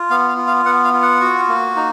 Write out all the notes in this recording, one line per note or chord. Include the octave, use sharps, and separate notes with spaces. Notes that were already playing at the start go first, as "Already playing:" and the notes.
Already playing: F4
B3 F5
F5
F4
F5
B3 F#5
F5
F4
F#5
F#4
A#3
D#4